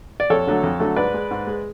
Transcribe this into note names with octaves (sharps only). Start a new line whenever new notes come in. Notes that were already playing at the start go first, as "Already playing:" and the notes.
D5
F2 A4 C#5
D3 F#3 A3
F2
D3 F#3 A3
G#2 B4 D5
G#3
G#2
G#3